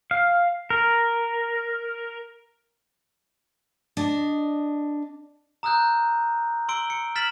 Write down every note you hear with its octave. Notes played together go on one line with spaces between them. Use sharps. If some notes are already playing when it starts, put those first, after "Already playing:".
F5
A#4
D4 D#5
A#5 D#6 E6 F#6 G6
C6 E6 D7 G7
C#7
F6 A6 B6 E7 F#7